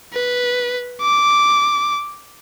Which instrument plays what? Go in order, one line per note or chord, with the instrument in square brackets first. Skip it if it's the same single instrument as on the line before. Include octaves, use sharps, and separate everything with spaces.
[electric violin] B4
D6